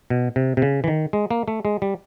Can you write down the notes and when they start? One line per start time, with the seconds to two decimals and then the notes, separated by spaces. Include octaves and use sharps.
0.10 B2
0.36 C3
0.57 C3
0.62 C#3
0.84 E3
0.88 D#3
1.13 G#3
1.30 A#3
1.48 A3
1.65 G#3
1.82 G3